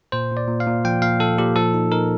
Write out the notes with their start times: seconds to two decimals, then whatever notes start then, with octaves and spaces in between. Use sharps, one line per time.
0.12 A#2 C5
0.31 A#2
0.37 D5
0.48 A#2
0.60 F5
0.67 A#2
0.85 F3 G5
1.02 A#2 F5
1.20 F3 A4
1.38 A#2 G4
1.56 F3 A4
1.74 D#4
1.92 D#4 A#4